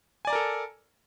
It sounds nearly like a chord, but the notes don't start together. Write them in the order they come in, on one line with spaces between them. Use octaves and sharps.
G#5 D5 A#5 A#4 A4